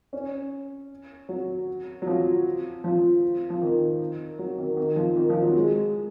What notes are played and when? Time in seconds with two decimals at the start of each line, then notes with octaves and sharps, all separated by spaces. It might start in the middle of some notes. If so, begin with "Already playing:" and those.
0.13 C#4
1.29 F#3
2.02 F#3
2.07 F3
2.84 F3
3.50 F3
3.62 D#3
4.39 F#3
4.58 D#3
4.77 D#3
4.96 F3
5.16 D#3
5.30 F3
5.42 F#3
5.55 G#3